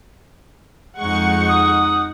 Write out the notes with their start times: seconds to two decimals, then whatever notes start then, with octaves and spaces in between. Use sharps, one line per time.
0.99 F2 G#3 D#4 F#5 C#6
1.49 D#6